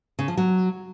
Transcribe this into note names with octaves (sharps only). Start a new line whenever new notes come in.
C#3
F3
F#3